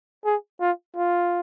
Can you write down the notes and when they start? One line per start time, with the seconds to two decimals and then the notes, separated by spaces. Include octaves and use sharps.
0.25 G#4
0.61 F4
0.96 F4